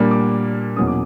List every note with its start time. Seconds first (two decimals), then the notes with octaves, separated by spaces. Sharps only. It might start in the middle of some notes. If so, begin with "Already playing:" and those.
Already playing: A#2 G3 A#3 D4
0.11 D6
0.76 E2 B2 F#3 A#3 C#4 D#6
0.87 D6